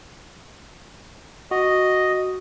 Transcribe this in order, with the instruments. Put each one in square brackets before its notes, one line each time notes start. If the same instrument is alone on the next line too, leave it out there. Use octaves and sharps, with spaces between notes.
[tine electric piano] F#4 [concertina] D#5